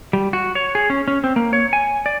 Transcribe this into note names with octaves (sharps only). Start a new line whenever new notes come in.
G3
F#4
C#5
G#4
C#4
C#4
C4
A#3
C#5
G#5
D5